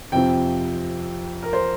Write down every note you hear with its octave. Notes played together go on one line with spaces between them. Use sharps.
F2 C3 F3 G5
A#4
C5